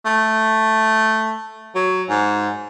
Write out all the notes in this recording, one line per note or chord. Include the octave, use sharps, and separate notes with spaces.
A3
F#3
G#2